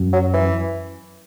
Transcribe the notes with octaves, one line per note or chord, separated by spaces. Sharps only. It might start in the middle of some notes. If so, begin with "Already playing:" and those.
Already playing: F#2
F#3
E3